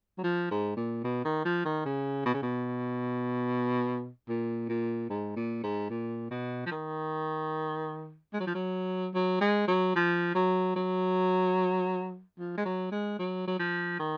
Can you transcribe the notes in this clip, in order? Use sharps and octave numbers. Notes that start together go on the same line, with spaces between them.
F#3
F3
G#2
A#2
B2
D#3
F3
D#3
C#3
B2
C#3
B2
A#2
A#2
G#2
A#2
G#2
A#2
B2
F3
D#3
G#3
F#3
F3
F#3
F#3
G#3
F#3
F3
F#3
F#3
F3
G#3
F#3
G#3
F#3
F#3
F3
D#3